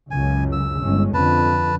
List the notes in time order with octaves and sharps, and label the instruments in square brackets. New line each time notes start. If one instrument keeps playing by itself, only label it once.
[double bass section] C#2 F#2 C#3 [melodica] G#5
[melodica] E6
[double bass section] G1 G#3 C#4
[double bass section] F2 D3 [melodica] B4 A5